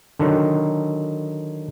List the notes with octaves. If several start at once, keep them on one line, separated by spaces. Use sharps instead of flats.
D3 D#3 F#3